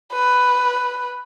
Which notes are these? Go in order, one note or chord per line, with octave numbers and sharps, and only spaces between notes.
B4